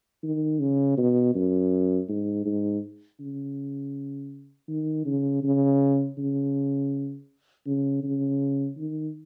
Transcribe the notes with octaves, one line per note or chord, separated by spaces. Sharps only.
D#3
C#3
B2
F#2
G#2
G#2
C#3
D#3
C#3
C#3
C#3
C#3
C#3
D#3